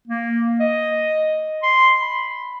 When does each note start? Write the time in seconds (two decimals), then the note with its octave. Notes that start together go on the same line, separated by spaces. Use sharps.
0.07 A#3
0.60 D#5
1.63 C6
2.01 B5